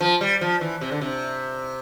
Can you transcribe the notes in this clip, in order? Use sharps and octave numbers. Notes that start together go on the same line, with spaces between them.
F3
G3
F3
E3
C3
D3
C3